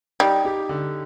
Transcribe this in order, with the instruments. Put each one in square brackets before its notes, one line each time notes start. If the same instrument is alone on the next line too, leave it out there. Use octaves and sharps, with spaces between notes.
[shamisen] G3 [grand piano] D#4
[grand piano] G4
D3